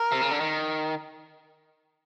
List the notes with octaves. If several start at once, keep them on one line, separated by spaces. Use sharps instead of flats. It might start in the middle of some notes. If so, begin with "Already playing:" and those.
Already playing: A#4
C3
C#3
D3
D#3